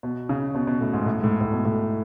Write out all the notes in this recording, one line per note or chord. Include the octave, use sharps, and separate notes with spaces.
B2
C#3
B2
B2
A2
G#2
A2
G#2
A2
A2
B2
A2